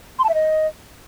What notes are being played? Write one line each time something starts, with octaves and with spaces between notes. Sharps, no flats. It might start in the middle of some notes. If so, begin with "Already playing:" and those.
C6
A5
E5
D#5